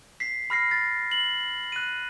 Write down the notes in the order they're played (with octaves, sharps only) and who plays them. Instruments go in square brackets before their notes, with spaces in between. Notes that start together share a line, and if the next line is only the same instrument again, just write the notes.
[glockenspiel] B6 C7
B5 F6 A#6 C7
A6
F#7
F#6 D#7